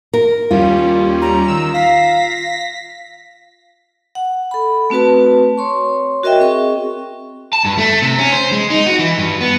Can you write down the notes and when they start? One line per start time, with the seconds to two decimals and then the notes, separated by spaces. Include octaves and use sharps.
0.14 A#4
0.51 D#2 G3 C#4 F4
1.22 A#5
1.48 D#3 E6
1.74 F5 A#6 B6
4.15 F#5
4.51 A4 B5
4.90 A3 C4 F#4 B4 A5
5.58 C#5 C6 C#6
6.23 F#4 A#4 D#5 E5 G5
6.40 C4 G#4 C#6
7.53 A5
7.65 G2
7.78 A3
8.02 C3
8.19 C#4
8.32 C5
8.52 G#3
8.70 D#4
8.86 F#4
8.99 E3
9.18 G2
9.41 B3